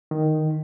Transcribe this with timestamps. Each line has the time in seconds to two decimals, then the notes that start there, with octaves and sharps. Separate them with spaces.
0.11 D#3